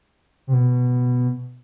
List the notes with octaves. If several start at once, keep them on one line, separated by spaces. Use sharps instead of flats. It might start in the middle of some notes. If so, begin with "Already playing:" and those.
C3
B2